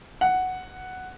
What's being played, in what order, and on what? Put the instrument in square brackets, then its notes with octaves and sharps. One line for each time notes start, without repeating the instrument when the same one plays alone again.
[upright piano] F#5